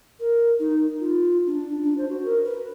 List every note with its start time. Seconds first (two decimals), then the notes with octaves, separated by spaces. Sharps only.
0.20 A#4
0.59 D#4
1.00 F4
1.47 D4
1.84 D4
1.98 C5
2.09 F#4
2.25 A#4
2.45 B4